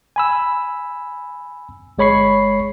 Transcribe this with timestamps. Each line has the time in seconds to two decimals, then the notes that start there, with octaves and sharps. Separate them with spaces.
0.16 G#5 B5 E6
1.98 G1 G#3 C#5 B5 C#6 C7